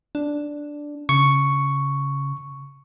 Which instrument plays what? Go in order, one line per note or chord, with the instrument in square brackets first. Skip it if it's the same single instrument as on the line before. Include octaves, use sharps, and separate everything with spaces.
[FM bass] D4
[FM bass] C#3 [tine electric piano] C#6